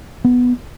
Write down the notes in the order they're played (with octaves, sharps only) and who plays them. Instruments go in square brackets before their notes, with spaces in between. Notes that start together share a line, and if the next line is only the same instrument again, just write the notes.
[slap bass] B3